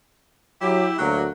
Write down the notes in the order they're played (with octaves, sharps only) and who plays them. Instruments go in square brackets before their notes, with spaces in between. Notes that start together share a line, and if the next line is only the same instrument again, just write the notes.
[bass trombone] F#3 [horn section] E4 G4
[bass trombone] D2 [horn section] F#3 A#3